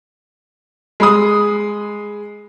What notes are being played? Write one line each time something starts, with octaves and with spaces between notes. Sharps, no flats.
G#3 B5 D#6